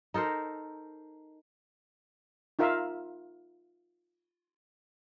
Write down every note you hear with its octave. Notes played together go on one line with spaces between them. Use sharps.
D#4 A4 A#4 C5
D#4 F4 A#4 E5 F5